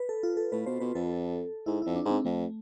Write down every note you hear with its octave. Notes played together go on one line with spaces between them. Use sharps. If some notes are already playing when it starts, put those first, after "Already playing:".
Already playing: B4
A4
F4
A4
A2 B4
B2 C5
B2 B4
F2 A4
G#2 E4
F2 E4
D4
G#2
C4
F2 A3